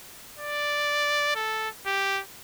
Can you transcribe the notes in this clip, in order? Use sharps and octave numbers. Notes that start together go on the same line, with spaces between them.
D5
A4
G4